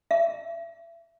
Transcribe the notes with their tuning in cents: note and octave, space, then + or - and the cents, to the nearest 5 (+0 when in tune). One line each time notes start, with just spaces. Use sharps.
E5 +30